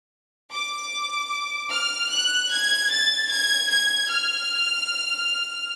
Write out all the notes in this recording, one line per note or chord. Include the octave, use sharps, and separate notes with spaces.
D6
F6
F#6
G#6
A6
G#6
G#6
F6